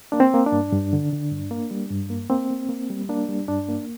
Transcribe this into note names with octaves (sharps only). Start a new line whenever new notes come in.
A#3 D4
C4
A#3
D4
G2
G2
D3
D3
G2
A#3
G3
G2
A#3
A#3 C4
A#3
A#3
G3
A#3 D4
G3
G2 D4
A#3